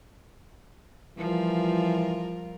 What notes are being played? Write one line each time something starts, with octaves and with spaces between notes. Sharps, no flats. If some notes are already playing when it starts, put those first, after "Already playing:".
E3 F3 G3 F4 A#4